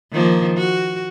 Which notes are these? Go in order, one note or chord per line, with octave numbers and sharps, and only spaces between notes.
D#3 F3 A#3
F#4